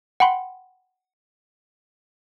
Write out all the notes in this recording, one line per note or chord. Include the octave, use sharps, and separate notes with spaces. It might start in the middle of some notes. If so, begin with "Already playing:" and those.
F#5 G5 B5 C6